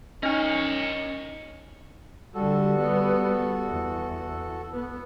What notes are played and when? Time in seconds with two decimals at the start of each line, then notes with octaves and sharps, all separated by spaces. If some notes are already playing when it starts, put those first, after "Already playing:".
0.23 C#4 D#4 A#4 C#5 D#5
2.35 D3 G3 F#4 A4
2.78 G3 B3
3.68 E2
4.73 B3